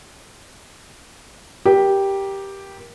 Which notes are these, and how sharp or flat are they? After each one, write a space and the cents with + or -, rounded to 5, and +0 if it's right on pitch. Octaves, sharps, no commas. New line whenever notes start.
G4 +0 A#4 +25